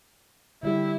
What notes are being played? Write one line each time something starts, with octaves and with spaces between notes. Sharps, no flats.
D3 G3 E4 G4